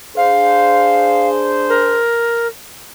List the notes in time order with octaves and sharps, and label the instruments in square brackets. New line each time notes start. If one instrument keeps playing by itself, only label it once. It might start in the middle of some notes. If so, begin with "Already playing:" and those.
[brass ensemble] D4 G#4 C5 [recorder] F5
[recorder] A#4